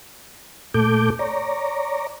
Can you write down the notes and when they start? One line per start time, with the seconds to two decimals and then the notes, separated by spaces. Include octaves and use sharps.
0.74 A#2 A3 A4 D6 G6
1.19 C#5 D5 A#5